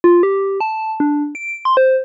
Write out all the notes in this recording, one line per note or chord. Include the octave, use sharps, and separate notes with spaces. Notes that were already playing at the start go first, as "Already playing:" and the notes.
F4
G4
A5
D4
D7
C6
C5